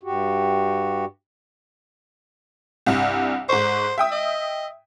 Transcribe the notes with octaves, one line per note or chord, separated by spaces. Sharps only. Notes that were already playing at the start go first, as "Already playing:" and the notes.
G2 F#4 G4
C2 G2
G#2 C5 C#6
E5 G5 D#6
D#5